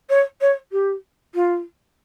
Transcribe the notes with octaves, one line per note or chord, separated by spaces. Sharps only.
C#5
C#5
G4
F4